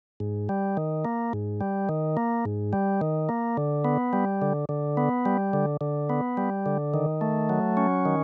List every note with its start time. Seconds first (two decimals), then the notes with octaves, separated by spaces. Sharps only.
0.20 G#2
0.49 G3
0.77 D#3
1.05 A#3
1.33 G#2
1.61 G3
1.89 D#3
2.17 A#3
2.45 G#2
2.73 G3
3.01 D#3
3.29 A#3
3.57 D3
3.85 B3
4.13 G3
4.42 D3
4.69 D3
4.97 B3
5.25 G3
5.53 D3
5.81 D3
6.10 B3
6.37 G3
6.66 D3
6.94 D#3
7.21 A3
7.49 F#3
7.77 C#4
8.05 D#3